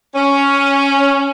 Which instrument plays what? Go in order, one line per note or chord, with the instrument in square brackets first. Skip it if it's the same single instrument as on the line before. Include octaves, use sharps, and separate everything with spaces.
[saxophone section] C#4